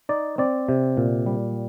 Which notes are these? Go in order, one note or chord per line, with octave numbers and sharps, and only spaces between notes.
D#4 D5
C4 D5
C3
A#2
G3